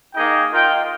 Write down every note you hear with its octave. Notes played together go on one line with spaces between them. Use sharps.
A#3 D#4 G#4 D#5 G5
F4 A#4 D#5 G5